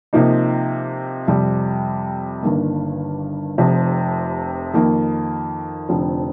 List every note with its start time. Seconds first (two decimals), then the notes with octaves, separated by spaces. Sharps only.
0.13 C3 F3 A#3 D#4
1.28 F2 C3 G3
2.43 G1 G2 D#3 A#3
3.58 F1 F2 C3 F3
4.74 F2 D#3 A#3
5.89 F1 F2 D3 F3 C4